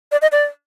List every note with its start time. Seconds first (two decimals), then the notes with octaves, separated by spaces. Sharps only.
0.12 D5
0.22 D#5
0.32 D5